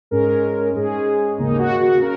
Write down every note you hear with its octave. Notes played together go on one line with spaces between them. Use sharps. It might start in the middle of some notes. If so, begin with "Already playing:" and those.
G#2 G#3 C#4 A#4
G#2 G#3 C#4 G#4
D#2 C#3 A#3 D#4
F#4
F#4
C#3 A#4